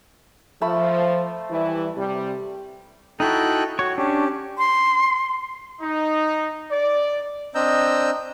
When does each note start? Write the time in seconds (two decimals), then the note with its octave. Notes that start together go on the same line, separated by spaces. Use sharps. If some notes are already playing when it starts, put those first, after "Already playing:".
0.61 F3 A3 A5 B5
1.50 E3 G3 E4
1.96 C3 G3
3.20 D#4 E4 F#4 A4 G5 F#6
3.79 F#4 C#5
3.98 C#4 D4 G4
4.58 C6
5.81 D#4
6.71 D5
7.55 C4 D4 D#5 A#5 E6 G6